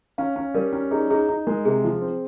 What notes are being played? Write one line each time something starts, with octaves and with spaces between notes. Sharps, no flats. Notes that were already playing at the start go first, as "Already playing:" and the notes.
C#4 F5
C#4
G3 A#4
C#4
D#4 G#4
D#4 G#4
D#4
G#3 A#4
C3 G#4
F3
C4